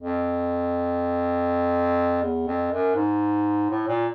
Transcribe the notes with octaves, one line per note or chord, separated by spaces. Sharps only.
F2
E2
F2
F#2
G#2
A2
A#2